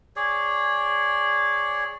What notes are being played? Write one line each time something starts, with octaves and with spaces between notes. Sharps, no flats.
G#4 C#5 D5